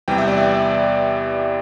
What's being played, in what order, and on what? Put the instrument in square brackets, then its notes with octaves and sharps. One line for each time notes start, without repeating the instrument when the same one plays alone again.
[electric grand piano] E2 C3 E3 G3 G5
E5
D5
E5